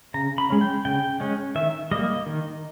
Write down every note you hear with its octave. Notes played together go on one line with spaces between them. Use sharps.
C#3 A#5
B5
G#3 C#4
G5
C#3 G5
G#3 C#4
D#3 E5
G3 A#3 D#5
D#3